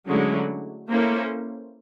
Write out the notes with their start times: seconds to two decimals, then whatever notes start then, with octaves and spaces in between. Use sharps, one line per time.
0.08 D3 F#3 G#3 A3 C#4 E4
0.89 A#3 C#4 E4 A4 C5